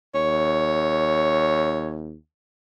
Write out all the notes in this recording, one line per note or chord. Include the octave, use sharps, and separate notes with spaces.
D#2 C#5